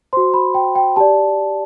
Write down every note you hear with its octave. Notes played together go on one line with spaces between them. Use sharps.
F#4 C5 C6
B5
G5
G5
G4 D5 A5